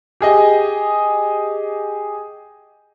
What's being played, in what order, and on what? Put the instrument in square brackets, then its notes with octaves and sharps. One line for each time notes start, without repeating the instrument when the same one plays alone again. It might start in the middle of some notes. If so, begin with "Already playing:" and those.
[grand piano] G4 G#4 D#5